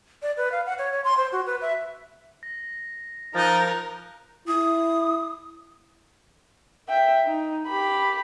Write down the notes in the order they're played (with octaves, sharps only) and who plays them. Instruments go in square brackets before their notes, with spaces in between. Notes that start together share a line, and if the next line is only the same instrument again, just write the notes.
[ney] D5
B4
F5
F#5
C#5
C#5
C6
C5
F#4
B4
E5
[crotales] A#6
[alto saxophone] F3 [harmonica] D#4 [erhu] A#4 [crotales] F#6 G6 A6
[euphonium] E4 [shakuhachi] D#6
[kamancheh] E5 G5
D#4
G4 B5